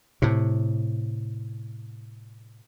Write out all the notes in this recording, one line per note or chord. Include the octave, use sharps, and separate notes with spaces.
A2 C3